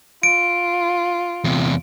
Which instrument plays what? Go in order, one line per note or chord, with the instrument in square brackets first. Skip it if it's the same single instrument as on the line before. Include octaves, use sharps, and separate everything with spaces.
[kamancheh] F4 [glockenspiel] D7
[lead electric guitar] E2 C3